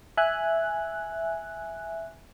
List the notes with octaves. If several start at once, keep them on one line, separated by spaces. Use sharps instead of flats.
E5 G#5 F#6